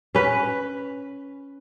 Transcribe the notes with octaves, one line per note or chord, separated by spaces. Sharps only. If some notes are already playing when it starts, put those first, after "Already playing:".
C#4 B4